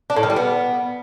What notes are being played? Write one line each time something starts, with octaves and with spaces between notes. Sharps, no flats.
D4
A2
D#3
G3
B3